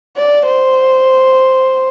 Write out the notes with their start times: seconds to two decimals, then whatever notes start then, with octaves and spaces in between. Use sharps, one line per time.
0.17 D5
0.46 C5